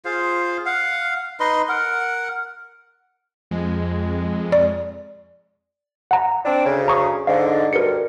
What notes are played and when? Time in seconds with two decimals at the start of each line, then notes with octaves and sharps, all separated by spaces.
0.05 F4 G#4 C5 F5
0.66 F5 F#5
1.40 D#4 B4 D#5 C6
1.69 A#4 F#5
3.51 F2 G#3
4.52 D5
6.11 F#5 A#5
6.45 C4 D4
6.65 D2 C#3
6.88 A#5 C#6 D#6
7.27 G#2 D3 F5
7.73 D2 G2 A#4 C#7